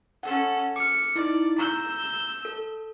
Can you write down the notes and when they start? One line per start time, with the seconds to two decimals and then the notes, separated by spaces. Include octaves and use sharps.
0.23 C#4 A4 F#5
0.76 D6 F6 C#7
1.16 D#4 E4 D5
1.58 A#5 E6 G6
2.45 A4